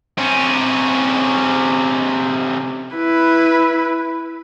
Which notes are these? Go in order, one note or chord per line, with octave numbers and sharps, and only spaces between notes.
C3 C#4
E4 B4